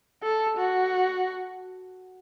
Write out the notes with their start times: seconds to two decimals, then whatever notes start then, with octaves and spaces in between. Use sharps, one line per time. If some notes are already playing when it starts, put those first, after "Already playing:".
0.23 A4
0.57 F#4